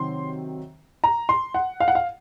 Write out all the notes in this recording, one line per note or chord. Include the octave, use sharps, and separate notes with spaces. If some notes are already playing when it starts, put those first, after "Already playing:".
Already playing: C3 D#3 F#3 C4 C6
A#5
C6
F#5
F5
F#5
F5